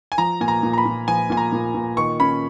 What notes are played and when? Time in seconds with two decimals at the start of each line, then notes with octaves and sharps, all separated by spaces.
0.12 G#5
0.18 F3 A#5
0.41 A#2 G#5
0.48 A#5
0.63 A#2
0.73 A#5
0.78 B5
0.85 A#2
1.08 F3 G#5
1.30 A#2 G#5
1.37 A#5
1.53 A#2
1.75 A#2
1.97 D#3 C#6
2.20 C#4 B5